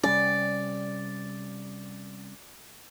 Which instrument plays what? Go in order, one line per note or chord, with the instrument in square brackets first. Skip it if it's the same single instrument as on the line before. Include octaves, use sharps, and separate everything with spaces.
[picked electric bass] C3 G3 C#4 [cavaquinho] D5